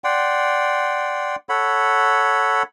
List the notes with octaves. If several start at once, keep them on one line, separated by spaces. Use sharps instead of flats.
D5 F#5 G5 C6
A4 C#5 F#5 B5